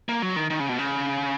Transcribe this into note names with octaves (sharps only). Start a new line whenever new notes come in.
A#3
F#3
D#3
D#3
C#3
B2
C#3